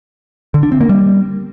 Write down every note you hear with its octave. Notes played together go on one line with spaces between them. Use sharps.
D3
D4
C4
A#3
G3